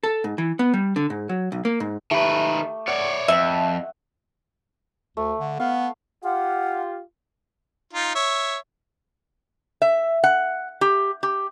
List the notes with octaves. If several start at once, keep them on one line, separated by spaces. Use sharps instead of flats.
A4
G#2
E3
B3
G3
D3
G#2
F#3
B1
A#3
G#2
D#3 A3 G4 B4
C#5 D5 F#5
F2 E5
D2 A3
D3
B3 F5
F4 G4 F#5
D#4 F4
C#5 E5
E5
F#5
G4
G4